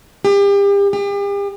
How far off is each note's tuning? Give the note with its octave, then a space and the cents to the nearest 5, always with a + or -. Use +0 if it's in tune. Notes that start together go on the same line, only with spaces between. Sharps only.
G4 +35
G4 +40